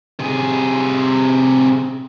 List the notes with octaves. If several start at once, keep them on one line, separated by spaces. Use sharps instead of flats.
C3 G#4